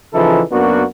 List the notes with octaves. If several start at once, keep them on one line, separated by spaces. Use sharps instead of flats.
C#3 E3 F3 D#4 E4 A4
F#2 A#3 B3 D4 F#4